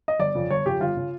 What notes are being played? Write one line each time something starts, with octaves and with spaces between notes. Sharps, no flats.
D#5
G1 D5
F2 C#3
G1 C#5
F2 C#3 G4
G1 F4
C#3